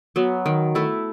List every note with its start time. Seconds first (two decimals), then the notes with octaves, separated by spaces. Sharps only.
0.16 F#3 B3
0.46 D#3
0.75 A3 E4